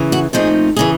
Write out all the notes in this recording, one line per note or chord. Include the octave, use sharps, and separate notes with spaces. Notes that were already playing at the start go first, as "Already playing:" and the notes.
Already playing: C#3 E3
F#4
A#2 F3 A3 C4 D#4 G#4
C#3 E3 G#4